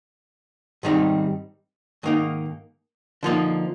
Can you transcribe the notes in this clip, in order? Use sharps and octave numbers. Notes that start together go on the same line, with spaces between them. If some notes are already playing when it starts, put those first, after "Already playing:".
G#2 D#3 G3 C4 D#4
G#2 D#3 A#3 D#4
D3 F3 A#3 D#4